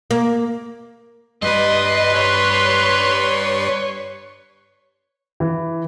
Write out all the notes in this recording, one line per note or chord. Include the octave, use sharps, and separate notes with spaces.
A#3
G2 G3 B4 D#5 C6
C#5
E3